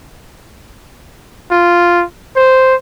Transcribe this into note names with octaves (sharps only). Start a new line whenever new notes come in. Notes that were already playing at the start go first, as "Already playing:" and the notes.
F4
C5